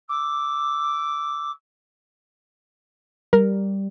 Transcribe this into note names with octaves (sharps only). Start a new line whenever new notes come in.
D6 E6
G3 A#4